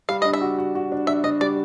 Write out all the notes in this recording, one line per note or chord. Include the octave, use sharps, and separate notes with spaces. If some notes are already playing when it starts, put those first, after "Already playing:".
G3 F5
D4 D#5
E5
F#4
F#4
F#4
D4
D4 E5
D4 D#5
G3 D5